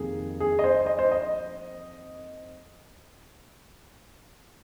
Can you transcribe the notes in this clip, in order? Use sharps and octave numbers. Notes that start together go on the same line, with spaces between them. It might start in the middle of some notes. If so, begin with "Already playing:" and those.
Already playing: F2 C3 D#3 A#3 G#4
G#4
D#5
C5
D#5
C5
D#5